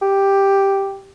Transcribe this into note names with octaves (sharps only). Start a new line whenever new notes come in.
G4